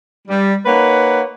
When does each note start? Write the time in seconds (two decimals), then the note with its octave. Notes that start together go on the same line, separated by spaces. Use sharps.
0.28 G3
0.66 A#3 D#4 B4 C#5 F#5